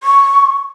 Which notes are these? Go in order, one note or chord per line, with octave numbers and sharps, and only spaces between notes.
C#6